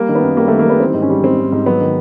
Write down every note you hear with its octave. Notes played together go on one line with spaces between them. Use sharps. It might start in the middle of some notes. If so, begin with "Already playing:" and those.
Already playing: G3 A#3
D#3
B3
F#2
G3 A#3
D#3 A3
A#3
G3 B3
E3 C4
G#2
C#4
G3
G#2 C4
G#2
G#2
F#3 B3
D#3